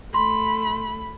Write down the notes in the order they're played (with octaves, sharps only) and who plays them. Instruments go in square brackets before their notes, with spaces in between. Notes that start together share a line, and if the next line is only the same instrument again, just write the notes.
[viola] A3 B5 [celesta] C6